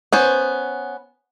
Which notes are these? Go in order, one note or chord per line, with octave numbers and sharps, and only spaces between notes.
B3 C#4 C5